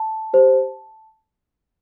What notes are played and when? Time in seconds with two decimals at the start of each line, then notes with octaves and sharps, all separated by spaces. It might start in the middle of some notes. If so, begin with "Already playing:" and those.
Already playing: A5
0.33 G4 C5